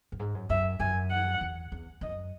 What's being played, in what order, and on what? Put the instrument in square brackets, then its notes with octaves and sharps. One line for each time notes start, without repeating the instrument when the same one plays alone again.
[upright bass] F#2
G#2
F#2
[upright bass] F#2 [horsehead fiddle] E5
[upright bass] F#2 [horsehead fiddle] G#5
[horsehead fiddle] F#5
[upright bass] E2
E2
[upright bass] F#2 [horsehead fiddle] D#5